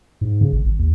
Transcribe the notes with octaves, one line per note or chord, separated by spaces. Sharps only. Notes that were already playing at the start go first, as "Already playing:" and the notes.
G#2
C#3
G#1
G#1
D#2